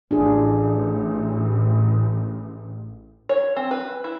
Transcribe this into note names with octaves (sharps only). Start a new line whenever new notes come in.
A1 D4 F4 G#4
C#5
C4
B4
E4